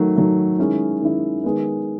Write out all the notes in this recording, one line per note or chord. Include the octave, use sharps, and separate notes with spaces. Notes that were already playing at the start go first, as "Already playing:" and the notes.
Already playing: D#3 F#3 A3
D#3 F#3 A3
D#3 G#3 C#4 E4
D#3 G#3 C#4 E4
D#3 G#3 B3